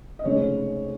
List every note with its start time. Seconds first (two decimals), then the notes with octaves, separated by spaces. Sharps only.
0.19 D#5
0.24 F1 F2 C#3 G#3 C#4 C#5